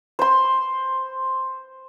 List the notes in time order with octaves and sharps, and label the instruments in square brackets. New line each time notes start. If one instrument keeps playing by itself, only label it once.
[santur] C5 C6